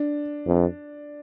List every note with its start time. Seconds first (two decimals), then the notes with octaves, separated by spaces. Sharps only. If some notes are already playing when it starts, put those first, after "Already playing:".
Already playing: D4
0.46 F2